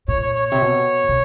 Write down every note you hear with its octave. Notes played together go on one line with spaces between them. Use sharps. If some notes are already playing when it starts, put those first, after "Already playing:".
A#2 C#5
C#5
C#5
C3 C#5
B2
B2